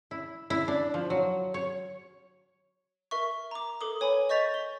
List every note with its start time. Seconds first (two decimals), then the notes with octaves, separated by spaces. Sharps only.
0.11 E4
0.50 E4
0.68 D4
0.94 F3
1.10 F#3
1.54 C#5
3.11 A#4 E5 C#6
3.51 A#5 D6
3.81 A4 A#4 D6 D#6
4.00 B4 C#5 G#5 B5
4.29 D#5 C#6 G6 A6 B6 F7
4.54 C#6 G7